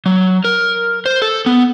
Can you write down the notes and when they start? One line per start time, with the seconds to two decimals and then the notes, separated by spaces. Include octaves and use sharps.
0.06 F#3
0.44 A#4
1.06 C5
1.22 A4
1.46 B3